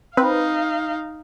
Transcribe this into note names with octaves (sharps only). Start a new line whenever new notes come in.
C4 D#4 B4 F5